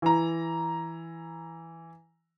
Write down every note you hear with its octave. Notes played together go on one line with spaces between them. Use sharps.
E3 A#5